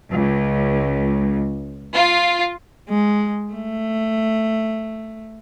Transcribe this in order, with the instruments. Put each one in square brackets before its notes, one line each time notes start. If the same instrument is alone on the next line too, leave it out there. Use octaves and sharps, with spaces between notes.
[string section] C#2
F4
[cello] G#3
A3